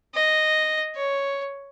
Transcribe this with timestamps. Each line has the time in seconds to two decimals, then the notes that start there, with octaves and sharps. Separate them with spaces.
0.15 D#5
0.96 C#5